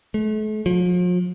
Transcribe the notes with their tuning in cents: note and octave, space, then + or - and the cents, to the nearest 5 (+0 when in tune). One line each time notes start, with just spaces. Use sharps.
A3 -40
F3 +40